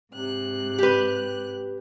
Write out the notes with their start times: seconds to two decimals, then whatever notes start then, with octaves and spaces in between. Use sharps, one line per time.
0.13 G#2 C3 F#6
0.79 G4 B4